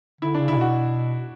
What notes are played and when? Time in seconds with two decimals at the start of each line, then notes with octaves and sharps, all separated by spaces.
0.21 D3 E4
0.34 C#3 D4
0.48 C#3 E4
0.56 B2 F#4